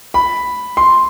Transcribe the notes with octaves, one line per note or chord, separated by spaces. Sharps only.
B5
C6